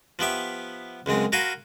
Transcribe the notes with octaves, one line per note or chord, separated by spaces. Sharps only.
F3 B3 G4 E5
C#2 F#2 G#3 C4
F#4 A#4 F5 G#5 B5 C6